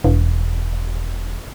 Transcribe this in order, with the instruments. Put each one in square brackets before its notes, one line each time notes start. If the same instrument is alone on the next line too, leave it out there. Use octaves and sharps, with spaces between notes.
[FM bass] E1